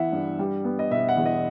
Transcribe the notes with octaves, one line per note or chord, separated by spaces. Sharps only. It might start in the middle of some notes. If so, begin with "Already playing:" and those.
Already playing: E3 B3 E4 E5 F#5
G2
G3
B3
D#5
B2 E5
F#5
E2
D#5